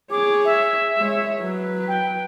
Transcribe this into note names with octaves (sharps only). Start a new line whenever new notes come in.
G#4 C#5 D6
E5
G#3 C#5
F#3 B4
G5